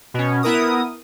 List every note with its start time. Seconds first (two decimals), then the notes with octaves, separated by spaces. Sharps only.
0.14 B2 C#4
0.43 B3 E4 A#4 D#6